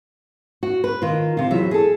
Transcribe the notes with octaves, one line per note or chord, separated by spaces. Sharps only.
F#4
B4
D#3 F4
C3 F4
E2 F#3 E5
G#4 A4